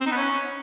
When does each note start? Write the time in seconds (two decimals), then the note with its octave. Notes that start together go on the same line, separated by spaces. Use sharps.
0.01 C4
0.06 D#4
0.12 B3
0.17 C#4